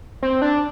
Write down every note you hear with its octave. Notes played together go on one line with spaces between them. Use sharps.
C4
D4